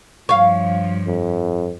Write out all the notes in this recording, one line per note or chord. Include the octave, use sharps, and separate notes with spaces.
G2 F3 C#5 F5 C#6
F2